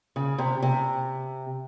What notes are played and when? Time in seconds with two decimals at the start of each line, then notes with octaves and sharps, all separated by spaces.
0.16 C#3
0.38 C3
0.62 C3